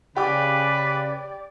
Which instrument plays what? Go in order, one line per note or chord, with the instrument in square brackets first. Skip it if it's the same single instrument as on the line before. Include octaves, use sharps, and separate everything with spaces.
[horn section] C#3 [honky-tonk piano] G4 D6 [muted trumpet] B4 [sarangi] D5